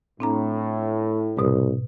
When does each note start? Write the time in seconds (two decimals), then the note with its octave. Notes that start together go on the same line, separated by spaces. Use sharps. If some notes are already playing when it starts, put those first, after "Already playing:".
0.20 A2 C4 D4 A#5
1.38 C2 G#2 B2 D#6